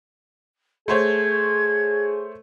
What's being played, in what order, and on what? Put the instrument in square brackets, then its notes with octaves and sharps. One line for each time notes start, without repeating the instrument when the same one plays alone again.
[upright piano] A3 C5 C#5 [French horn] G#4 [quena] G#6